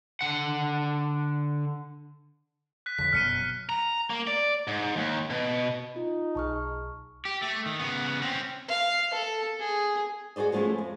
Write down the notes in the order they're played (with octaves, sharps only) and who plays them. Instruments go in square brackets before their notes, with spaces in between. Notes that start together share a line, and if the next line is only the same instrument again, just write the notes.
[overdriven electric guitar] D3 F#5
[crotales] F#6 B6
[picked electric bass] F2 D3 [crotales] B6
[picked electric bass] G1 F#2 B2 [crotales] F6 C#7 D#7
[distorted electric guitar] A#5
A#3
D5
G#2
D#2
B2
[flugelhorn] D#4 [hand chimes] F4
[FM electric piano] B1 G#4 [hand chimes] A5 C#6 F6
[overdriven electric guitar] G4
A3
D#3
C#3 B3
C4 C#4
[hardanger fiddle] F5
A4
G#4
[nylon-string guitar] F#4 G#4 C5 D5 D#5
F3 G#3 A3 B3 C#4
F2